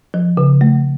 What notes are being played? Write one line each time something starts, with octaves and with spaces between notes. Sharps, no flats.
F3
C#3
A3